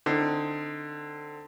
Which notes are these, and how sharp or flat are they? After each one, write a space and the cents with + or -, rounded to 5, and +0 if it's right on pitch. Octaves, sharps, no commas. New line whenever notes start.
D3 +15 C4 +0 D#4 +10